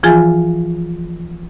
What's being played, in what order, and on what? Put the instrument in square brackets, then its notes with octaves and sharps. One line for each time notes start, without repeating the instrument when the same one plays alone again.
[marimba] E3 F3 F4 G#4 G#5 A6